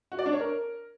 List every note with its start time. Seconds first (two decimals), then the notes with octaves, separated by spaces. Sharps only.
0.12 F#4
0.19 D5
0.26 D4
0.33 C#5
0.40 A#4